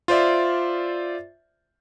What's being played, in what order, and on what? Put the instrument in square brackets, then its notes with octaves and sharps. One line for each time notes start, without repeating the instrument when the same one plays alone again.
[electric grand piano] F4 C5 D5 E5